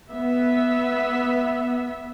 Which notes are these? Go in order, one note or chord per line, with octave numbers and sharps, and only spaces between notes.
B3 E5